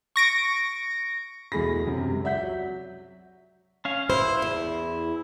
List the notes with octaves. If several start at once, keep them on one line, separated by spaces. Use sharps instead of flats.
C#6 A#6 D7
E2 B2 A3 G#4 B5 A#6
F#2 C3
C#2
D5 E5 F#5 G6 B6
F#3
C#4 F5
E4 C5
E2